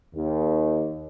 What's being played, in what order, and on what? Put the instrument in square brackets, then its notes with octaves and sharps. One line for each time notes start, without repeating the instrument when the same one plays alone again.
[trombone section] D#2